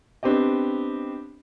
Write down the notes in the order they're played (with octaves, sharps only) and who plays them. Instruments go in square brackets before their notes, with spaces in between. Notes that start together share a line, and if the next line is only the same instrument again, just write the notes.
[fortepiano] B3 C4 D4 G4 D#5